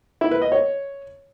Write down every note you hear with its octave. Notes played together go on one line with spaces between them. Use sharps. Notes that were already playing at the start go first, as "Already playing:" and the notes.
E4
B4
D#5
C#5